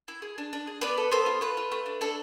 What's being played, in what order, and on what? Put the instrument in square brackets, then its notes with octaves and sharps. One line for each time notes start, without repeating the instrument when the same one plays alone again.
[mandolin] E4
G#4
D4
D4
G#4
B3 B4 D5
A4
B3 A4 C5
F4
A3 B4
F4
A3
D4
D4 A4